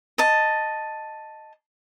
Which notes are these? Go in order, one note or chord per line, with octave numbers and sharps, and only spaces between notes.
D#5 A5